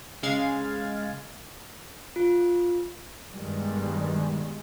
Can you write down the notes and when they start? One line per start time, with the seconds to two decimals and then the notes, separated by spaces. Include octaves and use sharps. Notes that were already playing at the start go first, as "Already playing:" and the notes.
0.23 C#3 G#3 G#4 F5 G#6 A6
2.16 F4
3.33 G2 B2 D#3 G3 G#3